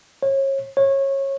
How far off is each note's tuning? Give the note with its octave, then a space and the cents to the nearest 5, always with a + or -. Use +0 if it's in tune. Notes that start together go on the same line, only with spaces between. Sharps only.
C#5 -30
C#5 -20